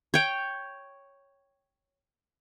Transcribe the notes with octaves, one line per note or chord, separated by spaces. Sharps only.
C#5 G5